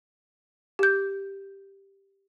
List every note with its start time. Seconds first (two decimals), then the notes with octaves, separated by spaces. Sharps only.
0.79 G4 G6